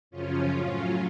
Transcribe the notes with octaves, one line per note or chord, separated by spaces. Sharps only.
F#2 C#3 F3 C#4 F4
A2 F#3 C#4 F4